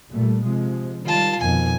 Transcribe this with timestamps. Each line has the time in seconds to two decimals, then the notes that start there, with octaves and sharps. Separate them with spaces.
0.11 A#2 G3 A3
0.45 C3 F3 G#3
1.06 D#3 G3 F4 A5
1.41 F2 B2 D#3 G#5